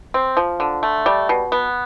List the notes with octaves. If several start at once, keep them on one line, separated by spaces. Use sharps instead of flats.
C4
F3
D3
A3
G3
B2
B3